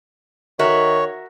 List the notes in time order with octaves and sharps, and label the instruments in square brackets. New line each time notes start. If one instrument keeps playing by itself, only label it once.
[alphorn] D#3 [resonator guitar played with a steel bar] F#4 A#4 E5 [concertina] C#5